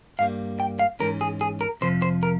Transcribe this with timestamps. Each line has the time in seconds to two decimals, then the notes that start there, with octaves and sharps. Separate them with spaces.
0.19 G2 G3 A#3 F5
0.60 G5
0.79 F5
1.00 G#2 E3 G#3 C#4 A#4
1.21 G#4
1.41 G#4
1.61 A#4
1.81 F2 C3 F3 C5
2.02 C5
2.23 A#4